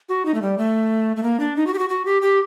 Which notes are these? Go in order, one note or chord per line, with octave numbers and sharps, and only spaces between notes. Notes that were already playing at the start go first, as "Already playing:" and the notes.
F#4
D#4
A3
G3
A3
A3
A#3
D4
D#4
F#4
G4
F#4
F#4
G4
G4